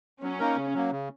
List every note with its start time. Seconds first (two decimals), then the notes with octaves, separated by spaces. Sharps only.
0.22 F#3 C#4
0.40 A#3 D#4 A#4
0.57 C#3
0.74 F#3 A#3
0.91 C#3